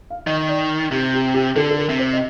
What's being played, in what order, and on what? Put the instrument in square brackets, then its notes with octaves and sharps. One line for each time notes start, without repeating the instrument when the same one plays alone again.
[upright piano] F5
[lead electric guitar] D#3 [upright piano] D#5
[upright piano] D5
[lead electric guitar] C3 [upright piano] G4
[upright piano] G4
G4
[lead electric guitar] D3 [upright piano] A4
[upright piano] A4
A#4
[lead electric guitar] C3
[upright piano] C5
D#5